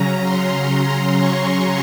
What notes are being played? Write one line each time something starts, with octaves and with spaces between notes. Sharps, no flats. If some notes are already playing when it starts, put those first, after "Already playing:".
Already playing: C#3 F#3 C#4 A#5
C6
C#6